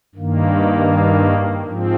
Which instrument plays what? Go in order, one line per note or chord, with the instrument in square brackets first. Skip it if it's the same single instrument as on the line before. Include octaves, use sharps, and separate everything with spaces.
[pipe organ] G2 D#3 A#3
G#2 F3 C4